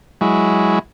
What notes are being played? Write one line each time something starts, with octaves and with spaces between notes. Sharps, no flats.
F#3 G#3 E4